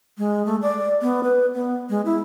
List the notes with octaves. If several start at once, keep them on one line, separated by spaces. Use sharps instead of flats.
G#3
A3
D5
B3
B4
B3
G#3
E4